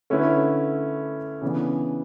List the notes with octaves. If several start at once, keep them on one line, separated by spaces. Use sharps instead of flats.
D3 A3 C#4 E4 B4
C#3 E3 B3 D4